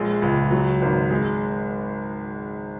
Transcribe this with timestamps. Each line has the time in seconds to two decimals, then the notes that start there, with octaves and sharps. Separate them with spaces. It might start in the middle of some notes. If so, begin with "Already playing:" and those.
Already playing: A#1 G#3
0.22 C#2
0.51 F#3
0.82 G#1
1.10 G#3